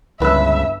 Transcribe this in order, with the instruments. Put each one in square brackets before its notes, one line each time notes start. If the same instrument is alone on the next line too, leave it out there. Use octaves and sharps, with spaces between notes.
[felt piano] G1 E6 [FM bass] C#2 [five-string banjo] E3 B4 [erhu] E5